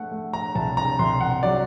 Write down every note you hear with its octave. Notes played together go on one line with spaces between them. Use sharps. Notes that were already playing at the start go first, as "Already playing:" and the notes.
Already playing: A3 F#5
A3
A#5
C2 A5
A#5
C2 C6
F#5
F#3 D5